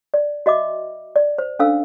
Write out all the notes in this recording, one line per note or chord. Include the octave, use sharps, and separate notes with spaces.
D5
F#4 D#5 E5 D6
D5
C5
C#4 D4 A4 C5 F5 E6